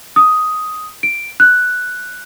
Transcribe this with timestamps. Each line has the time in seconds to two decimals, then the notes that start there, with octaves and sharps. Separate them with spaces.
0.16 D#6
1.03 D7
1.40 F#6